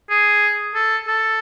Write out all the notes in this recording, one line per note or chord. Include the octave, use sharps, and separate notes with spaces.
G#4
A4
A4